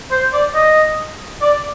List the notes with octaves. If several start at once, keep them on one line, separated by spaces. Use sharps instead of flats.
C5
D5
D#5
D5